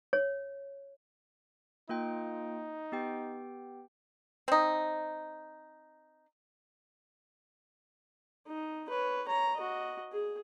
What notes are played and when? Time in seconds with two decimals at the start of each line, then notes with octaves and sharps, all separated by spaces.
0.13 C#5
1.89 A#3 D#4 F4 G5
2.92 B3 G4 G5
4.48 C4 D#4
8.47 D#4
8.89 B4 C#5
9.27 C#5 A#5
9.57 F#4 D#5
10.13 G#4